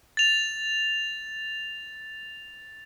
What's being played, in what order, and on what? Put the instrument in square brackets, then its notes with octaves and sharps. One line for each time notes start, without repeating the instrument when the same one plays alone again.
[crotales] A6 F7